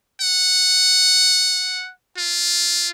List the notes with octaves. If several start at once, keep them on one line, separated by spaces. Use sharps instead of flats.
F#5
F4